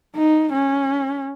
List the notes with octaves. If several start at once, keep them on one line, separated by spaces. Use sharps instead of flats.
D#4
C#4